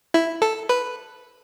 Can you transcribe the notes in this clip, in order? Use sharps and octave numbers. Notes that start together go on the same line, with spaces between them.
E4
A4
B4